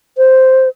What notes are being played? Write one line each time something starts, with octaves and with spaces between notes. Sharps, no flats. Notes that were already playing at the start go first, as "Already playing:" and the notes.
C5